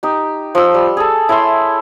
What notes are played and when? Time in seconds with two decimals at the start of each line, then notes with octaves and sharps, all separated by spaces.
0.03 D#4 G4
0.55 F3 E6
0.74 G3
0.97 G#4 A4
1.29 E4 C#5 E5 C6